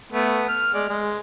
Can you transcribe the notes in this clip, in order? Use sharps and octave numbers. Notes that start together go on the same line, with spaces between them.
A3 B3
F6
G#3 D5
G#3